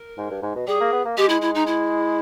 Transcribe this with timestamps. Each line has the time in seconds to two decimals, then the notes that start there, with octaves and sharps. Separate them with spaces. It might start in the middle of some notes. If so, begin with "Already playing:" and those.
Already playing: A#4
0.18 G#2
0.30 G2
0.42 G#2
0.55 B2
0.67 G3 G#4
0.80 A#3
0.92 B3
1.05 A#3
1.17 G#3 G4
1.29 E4
1.42 E4
1.55 D#4
1.67 E4